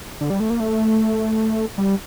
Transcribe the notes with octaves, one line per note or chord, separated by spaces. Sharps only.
D3
G3
A3
A#3
A3
G3